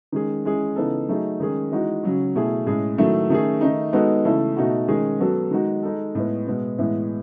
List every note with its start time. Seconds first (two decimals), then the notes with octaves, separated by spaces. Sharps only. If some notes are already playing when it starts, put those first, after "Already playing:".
0.12 D#3 G#3 C#4 G#4
0.45 E3 G#3 C#4 G#4
0.76 C#3 E3 B3 D#4 A4
1.08 F#3 A3 D#4 G#4
1.40 D#3 G#3 C#4 G#4
1.72 E3 G#3 D#4 F#4
2.03 C#3 F#3 C#4
2.35 B2 A3 E4 G#4
2.67 A2 G#3 C#4 G#4
2.98 D#3 F#3 A3 E4 A4
3.30 D#3 A3 C#4 G#4
3.61 D#3 A3 D#4
3.93 G#3 B3 D#4 F#4 A4
4.25 C#3 E3 A3 E4 A4
4.57 B2 A3 D#4 F#4
4.88 D#3 G#3 C#4 G#4
5.20 F#3 B3 F#4 A4
5.51 D#3 G#3 D#4 F#4
5.83 G#3 D#4 A4
6.15 A2 G#3 B3
6.47 B2 G#3 B3
6.78 A2 E3 G#3 B3 E4